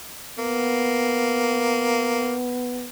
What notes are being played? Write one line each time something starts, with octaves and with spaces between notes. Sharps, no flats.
A#3 B3